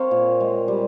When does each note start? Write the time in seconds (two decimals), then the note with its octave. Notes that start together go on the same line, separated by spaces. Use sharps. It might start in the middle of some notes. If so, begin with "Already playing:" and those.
Already playing: C4 A#4 C#5 F5
0.11 A#2
0.40 G#3
0.68 G3